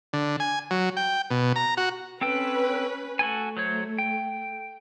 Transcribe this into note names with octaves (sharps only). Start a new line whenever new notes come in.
D3
G#5
F#3
G5
B2
A#5
F#4
C4 C#4 A4 B4 G5
A3 F#4 A4 G#5
F#3 C5 C#5
G5